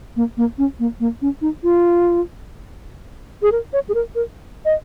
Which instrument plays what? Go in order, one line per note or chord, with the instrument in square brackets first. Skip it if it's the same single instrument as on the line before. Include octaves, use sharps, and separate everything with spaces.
[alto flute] A#3
A#3
C#4
A#3
A#3
C#4
D#4
F4
G#4
A#4
C#5
G#4
A#4
A#4
D#5